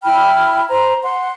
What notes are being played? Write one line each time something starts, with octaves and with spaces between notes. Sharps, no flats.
E4 G5 B5 F6
C5 A#5
F#5 C6